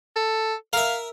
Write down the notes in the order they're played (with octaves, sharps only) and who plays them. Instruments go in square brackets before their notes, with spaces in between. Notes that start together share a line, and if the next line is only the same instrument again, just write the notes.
[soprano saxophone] A4
[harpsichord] A#4 E5 [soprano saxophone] F5